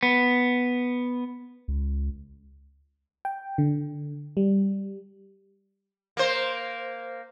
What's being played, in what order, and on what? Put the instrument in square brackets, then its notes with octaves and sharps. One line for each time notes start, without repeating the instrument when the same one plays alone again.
[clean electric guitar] B3
[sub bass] C#2
[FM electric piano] G5
D3
G3
[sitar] A#3 C5